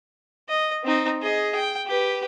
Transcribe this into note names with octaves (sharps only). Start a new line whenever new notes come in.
D#5
C4 D#4
G#4 D#5
G5
G4 B4